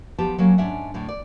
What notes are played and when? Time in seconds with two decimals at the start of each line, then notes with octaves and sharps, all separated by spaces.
0.18 F3 B3 G4 A5
0.38 F#3 A#3 C#4
0.58 G#2 C#4 D4 E5 F#5
0.94 A2 D3
1.08 D5